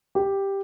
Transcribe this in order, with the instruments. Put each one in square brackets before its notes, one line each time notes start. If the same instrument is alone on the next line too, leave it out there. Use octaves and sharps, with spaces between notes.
[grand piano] G4